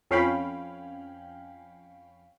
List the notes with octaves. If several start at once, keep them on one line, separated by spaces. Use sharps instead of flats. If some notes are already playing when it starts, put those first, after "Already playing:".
F2 C#4 F5 G5 B5